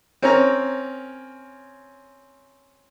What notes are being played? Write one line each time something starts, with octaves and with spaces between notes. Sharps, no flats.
C4 C#4 A#4 C#5 A#5